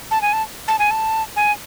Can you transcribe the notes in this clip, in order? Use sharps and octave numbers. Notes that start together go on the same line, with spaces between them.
A5
G#5
A5
A5
G#5
A5
G#5